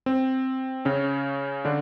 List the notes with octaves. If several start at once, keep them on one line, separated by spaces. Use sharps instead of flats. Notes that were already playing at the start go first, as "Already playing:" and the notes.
C4
C#3 C#4
D3 D4